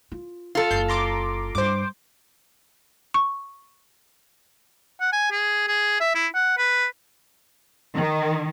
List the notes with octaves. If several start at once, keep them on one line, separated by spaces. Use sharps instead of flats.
F4
F4 A4
F#1 G6 C7
A#5 C6 D6
G2 C5 D6
C#6
F#5
G#5
G#4
G#4
E5
E4
F#5
B4
D#3